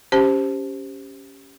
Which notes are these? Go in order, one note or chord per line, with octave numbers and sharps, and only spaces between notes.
C#4 G4 C5 A5